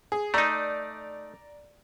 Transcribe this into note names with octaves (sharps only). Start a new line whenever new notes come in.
G#4
A3 D#4 D5 A#5